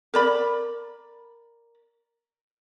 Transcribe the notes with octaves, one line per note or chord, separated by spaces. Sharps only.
A#4 D5 B5